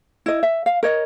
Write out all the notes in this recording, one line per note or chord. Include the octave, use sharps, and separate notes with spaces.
E4 D#5
E5
F5
A#4 C#5 D#5